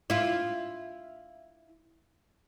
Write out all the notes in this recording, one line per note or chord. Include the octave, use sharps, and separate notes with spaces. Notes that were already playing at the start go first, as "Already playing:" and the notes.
E4 F4